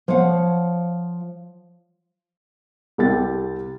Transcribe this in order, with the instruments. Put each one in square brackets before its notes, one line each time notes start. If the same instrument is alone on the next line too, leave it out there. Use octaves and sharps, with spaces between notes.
[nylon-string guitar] F3 C#5 F5 F#5
[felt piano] C2 G4 A6